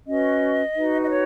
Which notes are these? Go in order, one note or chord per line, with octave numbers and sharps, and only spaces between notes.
C#4 F#4 B4 D#5
D#4 F#4 B4
D#5
C#5